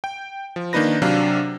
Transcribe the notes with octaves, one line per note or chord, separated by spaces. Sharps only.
G5
F3
D#3 A#3 D4 D#4 B4 A#6
C3 F#3 D4 F5